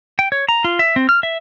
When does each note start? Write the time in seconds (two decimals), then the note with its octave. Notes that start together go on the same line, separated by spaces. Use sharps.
0.19 G5
0.32 C#5
0.49 A#5
0.64 F4
0.79 E5
0.96 C4
1.09 F6
1.23 E5